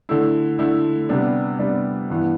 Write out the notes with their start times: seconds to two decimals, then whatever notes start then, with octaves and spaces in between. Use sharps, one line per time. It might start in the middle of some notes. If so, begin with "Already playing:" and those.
0.09 D3 A3 E4
0.59 D3 A3 E4
1.09 C3 G3 B3 D4
1.59 C3 G3 B3 D4
2.10 G2 E3 B3 E4